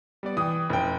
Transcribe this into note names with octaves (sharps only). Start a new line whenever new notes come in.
G3 B3 D5
E3 G5 D#6
F1 C#4 E4 G5